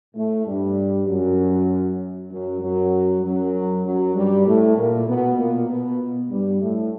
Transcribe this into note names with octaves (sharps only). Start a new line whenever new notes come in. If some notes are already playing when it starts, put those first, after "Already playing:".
A2 A3
G2 G3
F#2 F#3
F#2 F#3
F#2 F#3
F#2 F#3
F#2 F#3
G2 G3
A2 A3
A#2 A#3
B2 B3
A#2 A#3
B2 B3
G2 G3
A2 A3